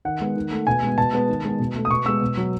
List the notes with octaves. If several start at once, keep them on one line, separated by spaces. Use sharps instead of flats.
D#3 F#5
G#3 B3
D#3
A3
B2 G#5
G#3 B3
B2 A5
G#3 B3
D#3
G#3 B3
B2
A3
D#6
B2 C#6
G#3 B3 E6
B2
F#3 B3